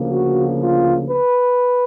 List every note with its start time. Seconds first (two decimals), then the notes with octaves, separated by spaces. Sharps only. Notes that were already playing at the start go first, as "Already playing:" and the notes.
Already playing: D2 C#3 F3 A#3
0.11 F#4
0.61 F4
1.11 B4